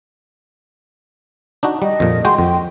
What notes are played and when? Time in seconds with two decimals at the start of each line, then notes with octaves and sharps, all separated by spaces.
1.63 D4 D#4 F#4
1.82 G3 D#5
2.00 F2 A#2
2.25 G#3 F#4 G5 C6
2.39 F2 G5